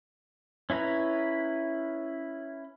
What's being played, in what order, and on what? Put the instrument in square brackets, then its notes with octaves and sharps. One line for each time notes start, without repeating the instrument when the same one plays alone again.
[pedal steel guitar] C#4 E4 B4 A#5